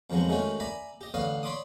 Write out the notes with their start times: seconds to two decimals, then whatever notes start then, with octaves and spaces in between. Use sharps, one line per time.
0.10 F2 D#3 F3 F#3 G#3 B3
0.29 D#3 G#3 A3 C#4 F#4 C#5
0.60 D5 E5 G#5 A#5 B5
1.01 G4 D#5
1.14 A1 D3 B4 C#5 F5 D#6
1.43 C#5 D5 B5 C6 D6 D#6